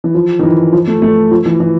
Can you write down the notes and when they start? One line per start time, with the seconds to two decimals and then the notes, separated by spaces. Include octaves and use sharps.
0.04 E3
0.15 F3
0.39 D#3
0.43 E3
0.72 F3
0.87 A3
1.02 A3
1.31 F3
1.46 E3
1.60 E3